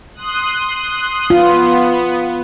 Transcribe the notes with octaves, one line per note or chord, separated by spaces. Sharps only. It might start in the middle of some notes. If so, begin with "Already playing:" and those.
C6 D#6 F#6
B3 F4